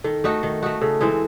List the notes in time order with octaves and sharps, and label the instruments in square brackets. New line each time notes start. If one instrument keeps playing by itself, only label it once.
[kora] D#3 [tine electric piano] A4
[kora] A3 D#4 F#4
D#3
A3 D#4 F#4
[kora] C#3 [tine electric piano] A4
[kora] E3 G#3 C4